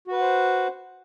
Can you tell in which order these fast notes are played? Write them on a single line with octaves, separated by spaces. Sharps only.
F#4 B4 F#5 C5